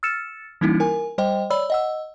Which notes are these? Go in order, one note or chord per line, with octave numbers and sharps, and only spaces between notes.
E6 F6 A6 C#7 E7
E3 G3 A#3 C#4 D#4 E4
A#4 G#5
G3 C5 D#5 G5
C#5 D5 B5 E6
D#5 F#5 E6